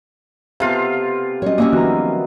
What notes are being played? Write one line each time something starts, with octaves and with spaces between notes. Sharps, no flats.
C3 B3 F4 A4 F5
F#3 G3 C#4 C#5 D#5
A#3 C#4 G4 D#5 E5
D#3 F3 B3 F#4 A#5